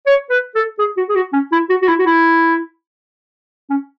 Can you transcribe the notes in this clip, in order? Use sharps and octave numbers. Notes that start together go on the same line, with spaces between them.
C#5
B4
A4
G#4
F#4
G#4
F#4
C#4
E4
F#4
F#4
E4
F#4
E4
C#4